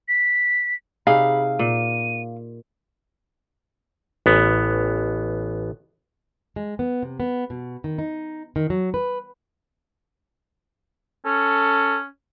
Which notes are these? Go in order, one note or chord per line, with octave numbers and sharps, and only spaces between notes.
B6
C3 D#4 G#4 F5 B5
A#2 D#7
A1 B3
G#3
B3
C3
B3
B2
D#3
D#4
D#3
F#3
B4
C#4 A4